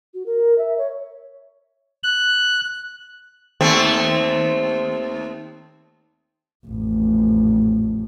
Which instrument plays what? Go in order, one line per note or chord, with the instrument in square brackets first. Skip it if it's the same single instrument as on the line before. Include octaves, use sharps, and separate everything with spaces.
[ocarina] F#4
A#4
E5
C#5
[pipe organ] F#6
[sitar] D#2 A3 C4
[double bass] A1 F2